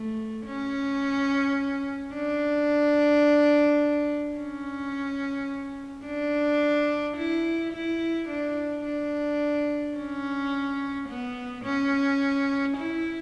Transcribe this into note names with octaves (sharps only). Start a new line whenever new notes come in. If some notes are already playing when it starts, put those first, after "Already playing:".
Already playing: A3
C#4
D4
C#4
D4
E4
E4
D4
D4
C#4
B3
C#4
E4